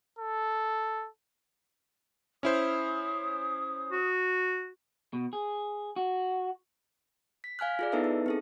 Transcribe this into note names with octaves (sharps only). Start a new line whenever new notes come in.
A4
C#4 E4 C5 D#6
F#4
B2
G#4
F#4
B6
F5 G#5 F6 F#6
F4 G#4 D5
B3 D#4 E4 A4 B4 E5
D#4
C4 G#4 A4